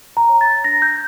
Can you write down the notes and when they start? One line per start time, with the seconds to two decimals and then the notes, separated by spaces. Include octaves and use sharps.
0.17 A#5
0.29 C#5
0.41 A6
0.64 D4 A#6
0.82 G6